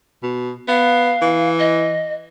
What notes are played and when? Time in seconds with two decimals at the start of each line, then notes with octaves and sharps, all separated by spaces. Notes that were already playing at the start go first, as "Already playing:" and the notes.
0.23 B2
0.68 B3 F5
1.22 E3
1.59 D#5